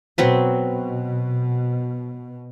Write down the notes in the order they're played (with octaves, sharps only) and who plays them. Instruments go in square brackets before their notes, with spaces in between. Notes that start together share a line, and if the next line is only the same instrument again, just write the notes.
[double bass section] B2 [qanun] F#3 C4 B4